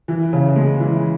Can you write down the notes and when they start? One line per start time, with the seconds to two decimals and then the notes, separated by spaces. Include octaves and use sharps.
0.08 E3
0.33 C#3
0.56 G#3
0.80 E3